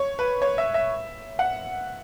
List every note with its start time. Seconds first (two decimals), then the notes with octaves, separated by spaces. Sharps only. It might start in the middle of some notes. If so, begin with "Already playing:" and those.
Already playing: C#5
0.19 B4
0.42 C#5
0.58 E5
0.74 E5
1.39 F#5